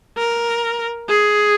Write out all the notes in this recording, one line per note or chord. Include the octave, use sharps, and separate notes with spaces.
A#4
G#4